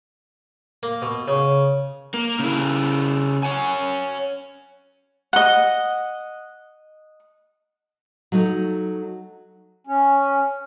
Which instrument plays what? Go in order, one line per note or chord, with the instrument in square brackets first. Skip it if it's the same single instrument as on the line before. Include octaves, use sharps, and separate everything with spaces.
[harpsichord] A#3
B2
C#3
[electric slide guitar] A#3
C#3 E4
C#5 F#5 G#5
[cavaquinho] D#5 F#5
[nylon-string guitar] F#3 A3 D#4
[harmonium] C#4